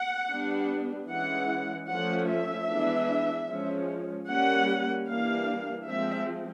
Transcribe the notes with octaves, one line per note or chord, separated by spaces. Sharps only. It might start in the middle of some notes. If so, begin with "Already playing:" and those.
Already playing: F#5
G3 B3 D4
E3 G#3 C#4 F#5
F3 A3 C#4 F#5
E5
E3 G#3 B3 D4
F3 G#3 C#4
G3 A#3 C#4 F#5
E3 G3 A#3 D4 F5
F3 G#3 C4 E5